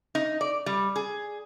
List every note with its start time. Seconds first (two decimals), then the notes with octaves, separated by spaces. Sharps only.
0.15 D#4
0.41 D5
0.66 G3
0.96 G#4